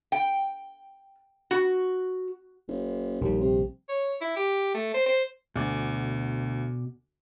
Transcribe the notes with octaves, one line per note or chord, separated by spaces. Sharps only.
G5
F#4
F#1
A#1 D#2 E3 G3
C3
C#5
E4
G4
A3
C5
C5
D2 B2 D5 G#5